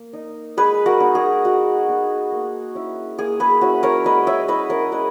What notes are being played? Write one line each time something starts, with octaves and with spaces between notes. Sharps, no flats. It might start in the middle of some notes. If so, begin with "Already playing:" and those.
Already playing: A#3
D#4
G#3 G#4 B4
F#4 A#4
B3 D#4
G#4
G#3 F#4
B3 D#4
A#3
C#4 E4
A#3 G#4
G#4 B4
C#4 E4 F#4
A#4 C#5
G#3 B4 D#5
C#5 E5
C#4 E4 B4 D#5
A#4 C#5
G#3 B4 D#5